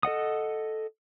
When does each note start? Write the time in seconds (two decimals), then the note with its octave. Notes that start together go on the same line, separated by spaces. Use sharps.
0.03 A4 D#5 F#5 D#6